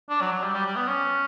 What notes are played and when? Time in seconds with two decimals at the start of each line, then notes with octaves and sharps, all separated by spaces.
0.10 D4
0.21 F#3
0.32 F#3
0.44 G3
0.54 G3
0.66 G3
0.76 B3
0.88 C#4